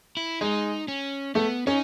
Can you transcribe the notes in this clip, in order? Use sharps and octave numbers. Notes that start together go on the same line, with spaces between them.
E4
G#3 D#4
C#4
A3 B3
C#4 D#4